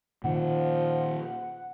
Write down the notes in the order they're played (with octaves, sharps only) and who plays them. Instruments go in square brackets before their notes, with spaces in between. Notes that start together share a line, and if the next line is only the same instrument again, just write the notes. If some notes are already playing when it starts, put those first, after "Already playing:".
[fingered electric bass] A#2 D#3 [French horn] F3 [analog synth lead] F#5